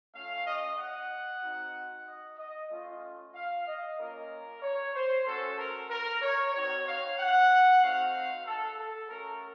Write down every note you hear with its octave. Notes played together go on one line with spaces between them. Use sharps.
A3 C#4 F4 F5
D#5
F#5
C4 D#4 F#4
D#5
D#5
A3 C#4 F4
F5
D#5
A#3 C#4 F4 A#4
C#5
C5
A3 C#4 F#4 A4
A#4
A#4
C#5
C4 D#4 F#4 C#5
F5
F#5
A3 C4 D#4 F#4 F5
A4
A4
A3 C#4 F#4 A#4